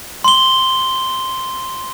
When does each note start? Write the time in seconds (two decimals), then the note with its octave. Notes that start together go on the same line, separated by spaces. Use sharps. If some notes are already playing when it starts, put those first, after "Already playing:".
0.24 C6 G7